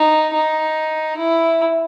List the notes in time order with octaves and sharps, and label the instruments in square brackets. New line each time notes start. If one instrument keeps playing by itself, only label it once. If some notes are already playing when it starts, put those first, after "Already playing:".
Already playing: [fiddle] D#4
D#4
E4